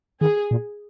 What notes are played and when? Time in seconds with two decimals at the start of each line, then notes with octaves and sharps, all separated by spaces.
0.21 D#3 G#4
0.51 A#2